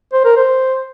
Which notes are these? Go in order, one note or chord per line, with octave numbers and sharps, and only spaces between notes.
C5
A#4
C5